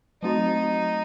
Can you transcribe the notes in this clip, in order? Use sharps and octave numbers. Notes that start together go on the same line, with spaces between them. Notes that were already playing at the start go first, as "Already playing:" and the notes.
F#3 A3 C4 D#4 F#4